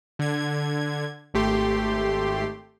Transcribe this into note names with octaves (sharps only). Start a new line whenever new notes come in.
D3 G#6
G#1 A3 G4 C6